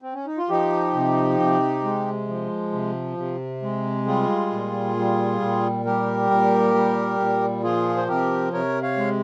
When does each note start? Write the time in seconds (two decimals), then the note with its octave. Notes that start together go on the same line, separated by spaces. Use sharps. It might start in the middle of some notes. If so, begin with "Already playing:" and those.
0.02 C4
0.14 C#4
0.26 D#4
0.38 F4
0.49 F3 D#4 G4
0.94 C3
1.40 C3
1.84 G#3
2.28 F3
2.73 C3
3.17 C3
3.62 G#3
4.06 G3 F4 G#4
4.51 A#2
4.96 G3
5.41 A#2
5.85 G3 G4 A#4
6.30 A#2
6.74 G3
7.19 A#2
7.64 F3 F4 G#4
7.97 C5
8.08 C3 G4 A#4
8.53 C3 A#4 C#5
8.82 C#5 F5
8.97 G#3